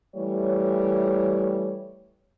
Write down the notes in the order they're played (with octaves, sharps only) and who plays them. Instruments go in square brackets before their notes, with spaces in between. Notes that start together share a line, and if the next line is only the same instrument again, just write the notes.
[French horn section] E3 G3 A3 C#5